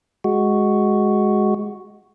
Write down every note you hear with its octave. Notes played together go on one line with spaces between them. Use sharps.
G#3 F#4